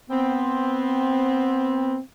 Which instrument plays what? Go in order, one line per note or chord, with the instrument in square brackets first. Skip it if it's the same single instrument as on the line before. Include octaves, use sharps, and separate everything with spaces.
[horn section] B3 C4